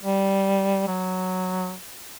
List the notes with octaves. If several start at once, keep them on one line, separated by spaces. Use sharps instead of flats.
G3
F#3